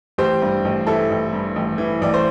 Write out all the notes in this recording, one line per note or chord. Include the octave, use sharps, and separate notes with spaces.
A1 G4 C5
G2
A1
E3 E4 A4
A1
G2
A1
E3
A1 D5
C5